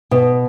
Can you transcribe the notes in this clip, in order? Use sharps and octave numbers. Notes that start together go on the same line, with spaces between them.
B2